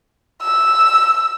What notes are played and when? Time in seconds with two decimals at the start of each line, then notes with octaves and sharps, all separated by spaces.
0.43 E6